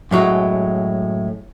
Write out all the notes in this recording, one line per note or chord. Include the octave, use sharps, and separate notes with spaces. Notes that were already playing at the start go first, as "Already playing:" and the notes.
F#2 A2 F#3 G#3